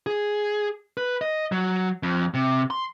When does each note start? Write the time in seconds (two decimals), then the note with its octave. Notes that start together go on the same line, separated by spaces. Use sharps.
0.07 G#4
0.97 B4
1.22 D#5
1.52 F#3
2.03 F2
2.34 C3
2.70 C6